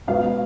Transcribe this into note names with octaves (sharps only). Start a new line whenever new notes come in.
B2 G#3 B3 F5